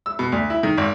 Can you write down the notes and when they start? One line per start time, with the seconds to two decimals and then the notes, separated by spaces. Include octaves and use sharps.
0.06 E6
0.19 B2
0.32 D2
0.50 E4
0.63 D#3
0.77 G#1